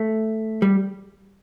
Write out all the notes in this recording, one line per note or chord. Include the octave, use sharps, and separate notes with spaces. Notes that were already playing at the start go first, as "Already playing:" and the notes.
Already playing: A3
G3